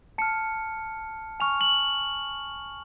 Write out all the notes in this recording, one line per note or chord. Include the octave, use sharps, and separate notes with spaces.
A5 F6 C#7
G#5 C#6 F6 F7
F#7